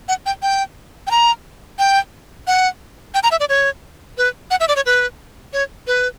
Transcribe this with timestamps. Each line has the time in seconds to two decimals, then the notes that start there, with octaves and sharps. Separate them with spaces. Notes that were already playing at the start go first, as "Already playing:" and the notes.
0.08 F#5
0.26 G5
0.42 G5
1.07 G5
1.11 A#5
1.79 G5
2.47 F#5
3.14 G5
3.23 A#5
3.31 E5
3.40 D5
3.49 C#5
4.17 B4
4.51 F#5
4.60 E5
4.68 D5
4.76 C#5
4.86 B4
5.53 C#5
5.87 B4